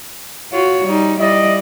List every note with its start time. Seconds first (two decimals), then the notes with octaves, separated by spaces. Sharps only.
0.52 F4 F#4 C#5
0.85 G3 D#4
1.20 G3 E4 D5 D#5